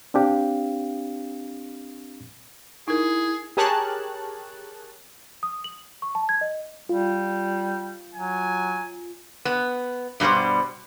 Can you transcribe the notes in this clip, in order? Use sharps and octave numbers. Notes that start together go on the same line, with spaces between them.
C4 D4 G4 F5
D#4 E4 G#4 A#4
G4 G#4 A#4 C#5 A5 F#6
D#6
F#7
C#6
A5
G#6
D#5
G3 F4
F#3 G#5
B3
G2 B2 G3 B3 C5